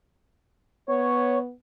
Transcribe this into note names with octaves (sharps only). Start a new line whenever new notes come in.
B3 C#5